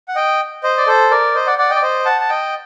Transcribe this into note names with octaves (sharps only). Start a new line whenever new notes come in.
F#5
D#5 G5
C5 D#5
D5
A4 C5
A#4 D5
C5 D#5
D5 F#5
D5 F#5
D#5 G5
D5
C5 D#5
F#5 A5
A5
D#5 G5